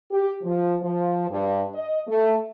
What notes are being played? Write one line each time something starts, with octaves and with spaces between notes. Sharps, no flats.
G4
F3
F3
G2
D#5
A3